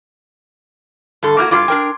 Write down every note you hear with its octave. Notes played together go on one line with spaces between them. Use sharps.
G2 D3 A4
A#3 E4 F#4 D6 F6 G#6
G2 F4 C6 D6
D4 A#4 G5